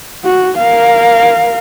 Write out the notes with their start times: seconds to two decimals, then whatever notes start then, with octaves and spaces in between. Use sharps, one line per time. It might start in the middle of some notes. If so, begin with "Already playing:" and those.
0.25 F#4
0.59 A#4 F5